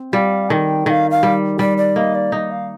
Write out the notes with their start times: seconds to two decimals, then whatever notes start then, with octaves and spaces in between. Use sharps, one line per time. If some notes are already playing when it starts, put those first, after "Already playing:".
Already playing: C4
0.13 G3 F5
0.49 D#3 G5 A5
0.86 D#3 F5 G5
1.11 F5
1.23 G3
1.59 G3 D5
1.78 D5
1.96 A#3 D#5
2.15 D5
2.32 D#4 D#5
2.51 F5